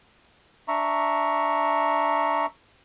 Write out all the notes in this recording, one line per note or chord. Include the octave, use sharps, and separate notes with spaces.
D4 E5 A#5 C#6